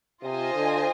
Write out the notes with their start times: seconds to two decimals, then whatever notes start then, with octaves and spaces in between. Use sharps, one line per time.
0.23 C3 F4 C5 D#5 G#5
0.54 D3